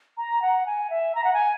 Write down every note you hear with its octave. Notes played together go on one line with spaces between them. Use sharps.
A#5
F#5
G#5
E5
A#5
F#5
G#5